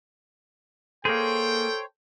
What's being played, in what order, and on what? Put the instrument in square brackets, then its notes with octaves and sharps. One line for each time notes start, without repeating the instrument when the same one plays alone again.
[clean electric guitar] A#3 G#4 [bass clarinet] A4 [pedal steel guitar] C5 C#5 [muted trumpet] G5